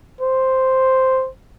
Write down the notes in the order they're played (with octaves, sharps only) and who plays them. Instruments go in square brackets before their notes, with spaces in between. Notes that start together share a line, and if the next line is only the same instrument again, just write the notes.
[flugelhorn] C5